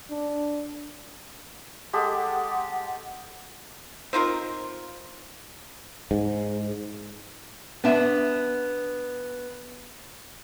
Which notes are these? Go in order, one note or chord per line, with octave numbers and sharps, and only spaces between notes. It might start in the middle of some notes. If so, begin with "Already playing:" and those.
D4
G#3 G4 A4 F#5
C4 D#4 F4 A#4
G#2
B3 D4 E5